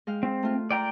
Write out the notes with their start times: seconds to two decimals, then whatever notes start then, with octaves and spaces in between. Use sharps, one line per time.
0.07 G#3 F5 G5
0.23 C4
0.43 A3 F4
0.71 F4 D5 G5 A#5